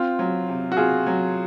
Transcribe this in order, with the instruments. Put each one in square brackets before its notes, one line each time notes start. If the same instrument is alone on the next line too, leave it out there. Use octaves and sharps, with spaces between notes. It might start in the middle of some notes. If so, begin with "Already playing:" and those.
Already playing: [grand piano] C4 [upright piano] F4
[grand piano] F#3
C3
[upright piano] F#4
[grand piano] C3 [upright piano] F4 G#4
[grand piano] F#3